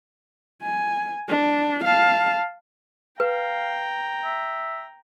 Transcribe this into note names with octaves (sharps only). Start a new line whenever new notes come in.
G#5
D4
F5 A5
B4 F5 G5 A#5
E5